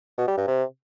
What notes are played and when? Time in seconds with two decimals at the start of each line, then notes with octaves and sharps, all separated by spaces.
0.18 B2
0.27 G3
0.37 G2
0.47 C3